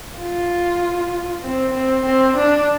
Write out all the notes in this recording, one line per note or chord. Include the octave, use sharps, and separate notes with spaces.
F4
C4
C4
C4
D4